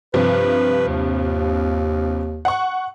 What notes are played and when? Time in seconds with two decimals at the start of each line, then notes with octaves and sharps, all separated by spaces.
0.14 G2 C3 F3 B4
0.88 D#2
2.45 F#5 C#6